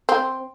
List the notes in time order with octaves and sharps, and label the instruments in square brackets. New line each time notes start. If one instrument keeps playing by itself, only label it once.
[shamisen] C4